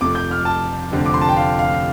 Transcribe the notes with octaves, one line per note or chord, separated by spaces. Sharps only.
F1 F2 F3 A3 D6
G6
F6
A5
F1 F2 D3 A3 C4
D6
C6
A5
G5
F5
F5